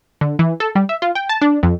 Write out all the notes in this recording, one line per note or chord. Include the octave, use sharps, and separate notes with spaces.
D3
E3
A4
G3
E5
F4
G5
A5
D4
F2